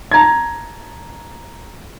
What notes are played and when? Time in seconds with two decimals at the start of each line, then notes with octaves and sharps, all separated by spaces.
0.11 A5 A#5 G#6